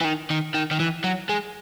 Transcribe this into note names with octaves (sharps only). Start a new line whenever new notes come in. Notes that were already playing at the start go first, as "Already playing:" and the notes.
E3
D#3
D#3
D#3
D#3
E3
F#3
G#3